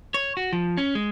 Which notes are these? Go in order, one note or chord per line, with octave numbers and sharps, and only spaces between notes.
C#5
F#4
F3
C#4
G#3